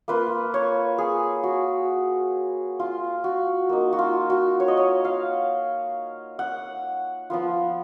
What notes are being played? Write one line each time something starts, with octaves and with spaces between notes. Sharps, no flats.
A#3 F4 B4
C#5
G#4
F#4
F4
F#4
A#3 D#4
F#4
F4
F#4
C#5
D#5
C#5
F5
F#5
F3 B3 F4